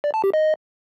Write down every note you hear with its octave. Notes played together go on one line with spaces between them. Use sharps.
D5
A5
G4
D#5